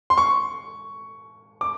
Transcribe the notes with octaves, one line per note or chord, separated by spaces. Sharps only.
C6
C#6
D6